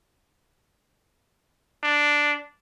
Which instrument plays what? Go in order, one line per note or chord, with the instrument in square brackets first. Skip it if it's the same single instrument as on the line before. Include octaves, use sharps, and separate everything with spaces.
[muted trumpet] D4